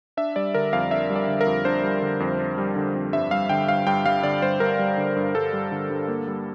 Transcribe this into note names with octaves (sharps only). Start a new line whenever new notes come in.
D4 E5
G3 D5
D3 A#4
F2 F5
D4 E5
G3
D5
D3
A#4
F2
D4 C5
G3
D3
F2
D4
G3
D3
F2
G2 E5
G3 F5
D3 G5
G2 F5
G2 G5
G3 F5
D3 D5
G2 C5
G2 A#4
G3
D3
G2
G2 A4
G3
D3
G2
A#3
G3